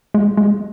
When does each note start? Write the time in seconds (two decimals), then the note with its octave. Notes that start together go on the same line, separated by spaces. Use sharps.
0.14 G#3
0.37 G#3